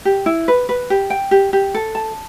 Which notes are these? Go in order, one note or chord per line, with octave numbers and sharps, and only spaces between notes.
G4
E4
B4
B4
G4
G5
G4
G4
A4
A5